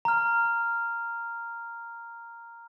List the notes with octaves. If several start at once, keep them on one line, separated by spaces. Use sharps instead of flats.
A#5 F6